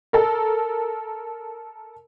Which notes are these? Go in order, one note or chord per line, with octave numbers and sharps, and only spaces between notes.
A4 A#4